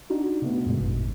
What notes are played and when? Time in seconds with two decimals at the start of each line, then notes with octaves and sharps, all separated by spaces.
0.10 D4 D#4 F#4
0.42 C3 A3 B3
0.66 F2 A#2 C#3 G#3
0.80 G#1 G2